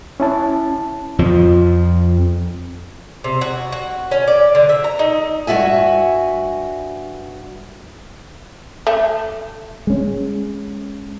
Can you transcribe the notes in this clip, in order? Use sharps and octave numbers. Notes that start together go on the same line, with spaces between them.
C#4 E4 A5
F2 F3
C3
F#4
F#4
C#4
D5
D3
E5
A#5
D#4
G2 A#2 F#4 E5 G#5
A3
G#3 C#4